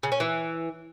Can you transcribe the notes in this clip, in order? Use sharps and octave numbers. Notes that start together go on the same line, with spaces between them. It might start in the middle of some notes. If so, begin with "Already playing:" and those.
C#3
C#4
E3